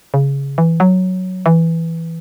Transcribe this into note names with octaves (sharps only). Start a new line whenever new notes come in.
C#3
E3
F#3
E3